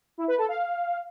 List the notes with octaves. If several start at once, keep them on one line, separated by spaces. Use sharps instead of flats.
E4
B4
A4
F5